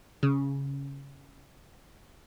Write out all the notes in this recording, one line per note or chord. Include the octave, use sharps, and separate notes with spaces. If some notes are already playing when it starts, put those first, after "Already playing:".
C#3